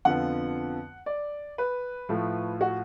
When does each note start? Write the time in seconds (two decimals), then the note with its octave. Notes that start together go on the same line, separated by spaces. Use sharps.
0.05 F2 D3 F3 B3 F#5
1.06 D5
1.58 B4
2.09 A2 F3 A3
2.61 F#4